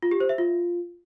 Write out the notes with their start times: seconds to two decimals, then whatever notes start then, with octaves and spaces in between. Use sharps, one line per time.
0.02 F4
0.11 G4
0.20 C5
0.29 E5
0.38 F4